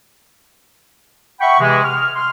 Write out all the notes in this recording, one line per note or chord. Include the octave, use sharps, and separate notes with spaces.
E5 F#5 G5 B5 C#6
C3 E3 G#3
F6
C6 F6